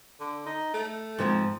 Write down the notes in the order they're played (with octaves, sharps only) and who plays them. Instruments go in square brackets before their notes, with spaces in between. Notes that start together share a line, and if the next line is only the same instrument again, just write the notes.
[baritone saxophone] D3
D#4
A3
[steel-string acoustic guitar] G#2 F3 C4